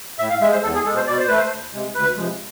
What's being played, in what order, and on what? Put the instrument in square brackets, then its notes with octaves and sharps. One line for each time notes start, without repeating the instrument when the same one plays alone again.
[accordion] A2 E5
F5
G#3 E5
C5
E2 A4
G#4
G#3 A4
B2
C5
B2 D5
C5
A3 B4
C5
D2
C3 G#3
D2 B4
C3 F3 G#3